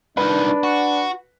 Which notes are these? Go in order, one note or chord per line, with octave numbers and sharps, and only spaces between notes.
C2 D#3 D4 B4
F#4